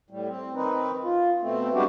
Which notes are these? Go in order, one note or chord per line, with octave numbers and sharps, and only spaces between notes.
A2 G3
C4
D#3 C4 D#4 B4
F4
B2 A3 C4
G3 G#3 B3 D4 F#4 G4